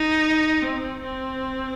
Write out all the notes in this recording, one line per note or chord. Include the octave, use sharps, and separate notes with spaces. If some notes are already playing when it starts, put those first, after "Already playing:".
Already playing: D#4
C4
C4